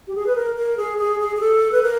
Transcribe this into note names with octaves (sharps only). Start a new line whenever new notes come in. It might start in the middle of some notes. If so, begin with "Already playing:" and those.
G4
G#4
B4
A#4
A#4
G#4
G#4
G#4
G#4
A4
B4
A#4